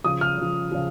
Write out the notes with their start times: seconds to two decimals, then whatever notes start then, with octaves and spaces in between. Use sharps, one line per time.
0.04 C#3 F3 D#6
0.21 F6
0.38 C#3 F3
0.72 C#3 F3